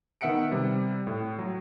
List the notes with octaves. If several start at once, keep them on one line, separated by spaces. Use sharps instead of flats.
D#3 B3 E5 F#5 C#7 D7
C3 G3
A2
F#3